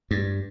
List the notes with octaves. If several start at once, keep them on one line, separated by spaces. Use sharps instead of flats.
G2